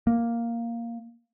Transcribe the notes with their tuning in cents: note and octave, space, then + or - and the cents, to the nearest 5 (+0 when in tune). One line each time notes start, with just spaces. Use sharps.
A#3 +0